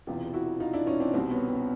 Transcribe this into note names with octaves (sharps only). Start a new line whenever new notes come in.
E1 E2 C3 E3 F4 G4
E4 F#4
D#4 F4
D4 E4
C#4 D#4
C4 D4
C2 B2 C4
B3 C#4
C4